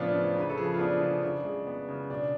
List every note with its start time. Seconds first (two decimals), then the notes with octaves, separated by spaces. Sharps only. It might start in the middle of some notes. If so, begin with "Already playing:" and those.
Already playing: A2 C#3 F3 B3 C#4 D4 F4
0.14 C#3
0.36 C#3 B4
0.50 A4
0.58 F3 G#4
0.74 F4
0.79 B3 D4
1.01 C#3
1.23 C#3
1.44 G#3
1.67 B3
1.89 C#3
2.09 B2 D4